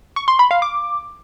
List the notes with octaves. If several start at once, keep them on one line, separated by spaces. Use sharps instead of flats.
C#6
C6
B5
F5
D6